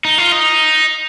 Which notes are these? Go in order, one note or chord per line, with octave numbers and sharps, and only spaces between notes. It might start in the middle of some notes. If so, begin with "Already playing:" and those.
D#4
F4
D#4